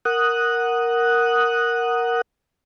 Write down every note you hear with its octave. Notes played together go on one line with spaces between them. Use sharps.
A#4 F#5 D#6 F#6